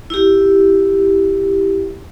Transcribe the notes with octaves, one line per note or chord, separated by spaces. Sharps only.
E4 G4